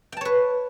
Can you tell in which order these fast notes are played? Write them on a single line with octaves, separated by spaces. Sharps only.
G5 A5 C#5 B4